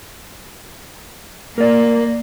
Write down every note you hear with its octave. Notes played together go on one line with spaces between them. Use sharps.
A#3 A#4 D5